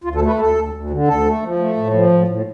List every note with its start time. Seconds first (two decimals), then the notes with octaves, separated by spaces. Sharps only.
0.04 D2 F4
0.15 A4
0.22 A3
0.27 B4
0.39 D2 A4
0.56 D2
0.74 D2
0.90 D3
1.08 D2 A4
1.26 A3
1.43 F3
1.59 A3
1.77 A2
1.93 F3
2.12 A2
2.28 A2